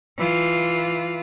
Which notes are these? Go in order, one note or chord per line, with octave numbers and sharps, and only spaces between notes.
E3 F4